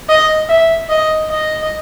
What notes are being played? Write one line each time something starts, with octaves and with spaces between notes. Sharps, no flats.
D#5
E5
D#5
D#5